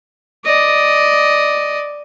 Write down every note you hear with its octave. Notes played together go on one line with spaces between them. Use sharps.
D5 D#5